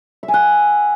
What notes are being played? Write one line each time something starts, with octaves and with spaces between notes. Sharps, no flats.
E5
G#5
F#5